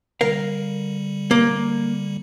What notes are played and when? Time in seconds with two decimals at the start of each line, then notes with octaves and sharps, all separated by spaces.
0.21 D3 G3 A#4 F5
1.31 A#3